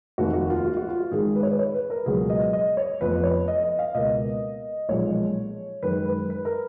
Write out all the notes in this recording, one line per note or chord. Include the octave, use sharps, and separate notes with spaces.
F1 D#2 D#3 A#3 F#4
F#4
F4
F#4
F#4
F4
F#4
G#1 G#2 D#3 G#4
B4
C#5
B4
C#5
B4
A#4
C#2 B2 F#3 G#4
D#5
D#5
C#5
F1 F2 F3 B3 B4
C#5
D#5
D#5
F5
C#2 B2 A#3 D#5
B1 A#2 F3 G#3 C#5
F#2 D#3 G#3 B4
B4
B4
A#4